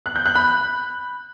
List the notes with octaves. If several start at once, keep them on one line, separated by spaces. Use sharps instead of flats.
F#6
G6
F#6
B5